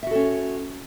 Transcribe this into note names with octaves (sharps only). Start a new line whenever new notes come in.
C#4 F#4 A4 E5